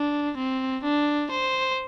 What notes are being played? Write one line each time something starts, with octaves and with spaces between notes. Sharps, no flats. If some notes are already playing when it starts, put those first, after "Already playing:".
Already playing: D4
C4
D4
C5